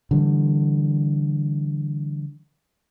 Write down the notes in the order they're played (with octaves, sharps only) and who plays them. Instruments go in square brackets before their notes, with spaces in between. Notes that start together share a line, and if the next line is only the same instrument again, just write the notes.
[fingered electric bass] D3 E3 G3